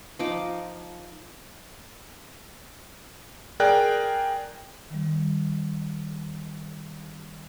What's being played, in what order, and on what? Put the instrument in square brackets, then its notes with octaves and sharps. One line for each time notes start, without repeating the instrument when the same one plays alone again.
[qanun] F3 D#4 D6
[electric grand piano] G#4 A#4 D5 G5 F#6
[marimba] D#3 G3